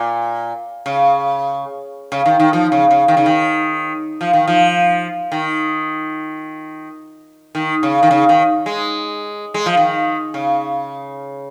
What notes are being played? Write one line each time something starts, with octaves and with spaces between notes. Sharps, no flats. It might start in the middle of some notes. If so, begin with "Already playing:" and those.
Already playing: A#2
C#3
C#3
D#3
D#3
F3
C#3
C#3
D#3
C#3
D#3
F3
D#3
F3
D#3
D#3
C#3
D#3
C#3
D#3
G#3
G#3
F3
D#3
C#3